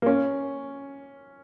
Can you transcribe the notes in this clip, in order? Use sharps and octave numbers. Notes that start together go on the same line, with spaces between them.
A#3
C#4